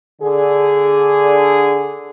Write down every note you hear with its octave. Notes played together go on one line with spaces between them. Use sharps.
D3 G#4